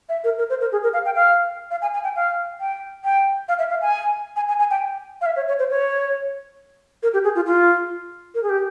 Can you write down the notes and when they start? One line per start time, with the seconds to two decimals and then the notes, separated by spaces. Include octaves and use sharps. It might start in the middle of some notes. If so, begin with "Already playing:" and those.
0.09 E5
0.24 A#4
0.38 A#4
0.50 C5
0.61 A#4
0.72 G#4
0.83 A#4
0.94 F5
1.05 G5
1.15 F5
1.71 F5
1.82 G#5
1.94 G#5
2.04 G5
2.16 F5
2.60 G5
3.04 G5
3.49 F5
3.59 E5
3.70 F5
3.82 G#5
4.36 G#5
4.49 G#5
4.59 G#5
4.71 G5
5.21 F5
5.26 E5
5.36 C#5
5.48 C#5
5.59 C5
5.70 C#5
7.03 A#4
7.13 G4
7.24 G#4
7.35 F4
7.46 F4
8.35 A#4
8.43 G#4
8.49 G4